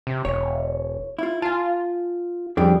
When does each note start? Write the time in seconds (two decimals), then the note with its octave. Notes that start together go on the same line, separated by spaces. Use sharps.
0.07 C3
0.25 E1 C#5
1.19 E4 F4
1.42 F4 G#5 A5
2.57 F2 G3 D4 G#4 G5